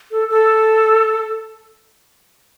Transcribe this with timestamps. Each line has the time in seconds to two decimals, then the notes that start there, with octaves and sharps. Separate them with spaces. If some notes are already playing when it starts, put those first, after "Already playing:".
0.11 A4
0.30 A4